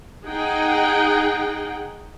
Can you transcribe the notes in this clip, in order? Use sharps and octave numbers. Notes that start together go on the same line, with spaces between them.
D#4 G#4 F#5 G5